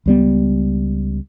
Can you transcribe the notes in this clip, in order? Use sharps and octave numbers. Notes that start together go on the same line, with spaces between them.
C#2 G3 B3